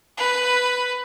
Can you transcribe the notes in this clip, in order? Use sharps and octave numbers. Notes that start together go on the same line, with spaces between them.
B4